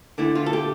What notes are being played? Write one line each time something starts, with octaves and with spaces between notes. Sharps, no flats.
D3 A3 E4
F4
A4
G4